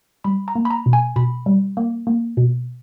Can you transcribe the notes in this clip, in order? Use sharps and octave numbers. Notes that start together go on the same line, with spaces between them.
G3 B5
A#5
A#3
B5
A#5
B2
G#5
B2 B5
G3
A#3
A#3
B2